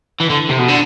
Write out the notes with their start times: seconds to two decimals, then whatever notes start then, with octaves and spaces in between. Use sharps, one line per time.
0.20 E3
0.29 D3
0.49 C3
0.59 B2
0.68 D3